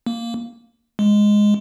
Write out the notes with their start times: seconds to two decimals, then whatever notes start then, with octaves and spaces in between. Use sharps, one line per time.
0.06 A#3
0.99 G#3